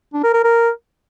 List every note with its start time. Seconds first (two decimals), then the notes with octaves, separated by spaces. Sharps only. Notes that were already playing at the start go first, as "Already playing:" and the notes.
0.14 D4
0.24 A#4
0.34 A#4
0.44 A#4